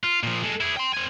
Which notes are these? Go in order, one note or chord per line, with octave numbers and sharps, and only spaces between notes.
F4
A#2 F3
G#3 A4
E4 G#4
G5 C6
C4 G#5